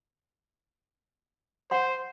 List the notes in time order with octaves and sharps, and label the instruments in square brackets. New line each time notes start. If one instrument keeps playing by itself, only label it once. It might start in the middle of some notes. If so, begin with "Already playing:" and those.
[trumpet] C5 [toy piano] F#5 C6